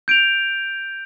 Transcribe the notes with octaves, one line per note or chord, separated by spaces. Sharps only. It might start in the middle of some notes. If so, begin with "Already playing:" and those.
G6 D7 F7